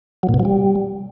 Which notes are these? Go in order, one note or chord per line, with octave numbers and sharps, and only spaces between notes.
F#3
A#2
B2
F#3
G3